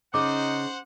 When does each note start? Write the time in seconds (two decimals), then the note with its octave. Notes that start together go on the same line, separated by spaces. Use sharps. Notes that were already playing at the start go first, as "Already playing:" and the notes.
0.14 C#3 D#4 C5 F#5 D6